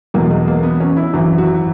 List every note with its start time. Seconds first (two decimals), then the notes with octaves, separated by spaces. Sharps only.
0.14 E2 B2 F#3 A#3
0.31 G#3
0.48 A#3
0.63 B3
0.80 C#4
0.97 E4
1.13 G#1 F#2 E3 F#4
1.38 F#4